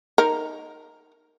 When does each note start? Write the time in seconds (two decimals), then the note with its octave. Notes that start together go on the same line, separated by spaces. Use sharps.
0.18 D#4 A#4